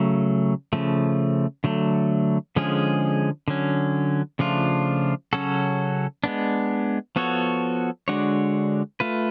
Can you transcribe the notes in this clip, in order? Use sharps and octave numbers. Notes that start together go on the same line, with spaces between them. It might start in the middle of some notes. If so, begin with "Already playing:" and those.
Already playing: C#3 F#3 A3
C#3 F3 A3
D3 F#3 A3
D3 F3 G#3 C#4 G#4
D3 F#3 C#4
C#3 F3 A3 D4 F4
C#3 F#3 C#4 F#4 A4
G#3 B3 D4
F3 B3 F#4 A4 C#5
D3 G#3 D4 F#4 C#5
A3 F4 B4